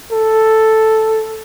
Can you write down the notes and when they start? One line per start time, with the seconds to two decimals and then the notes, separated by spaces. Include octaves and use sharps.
0.11 A4